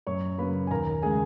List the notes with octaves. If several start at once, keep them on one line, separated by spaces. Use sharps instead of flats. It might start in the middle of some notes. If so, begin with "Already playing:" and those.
F#2 C#5 C#6
C#3 F#3 A#3 B4 B5
G#5
D#2 A#4 A#5
C#3 G#3 G#4 G#5